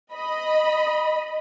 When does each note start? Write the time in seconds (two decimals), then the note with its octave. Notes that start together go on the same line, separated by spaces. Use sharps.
0.13 D#5 B5